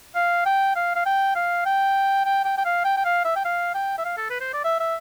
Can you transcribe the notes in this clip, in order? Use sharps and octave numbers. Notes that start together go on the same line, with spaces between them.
F5
G5
F5
F5
G5
F5
G5
G5
G5
G5
F5
G5
G5
F5
E5
G5
F5
G5
E5
F5
A4
B4
C5
D5
E5
E5